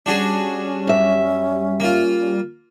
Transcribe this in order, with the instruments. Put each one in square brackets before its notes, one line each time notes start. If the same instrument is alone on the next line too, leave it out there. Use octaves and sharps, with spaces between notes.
[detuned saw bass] G3 [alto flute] C#4 [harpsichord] D4 F#4 G#4
[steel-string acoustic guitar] F#2 E5
[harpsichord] A#3 F4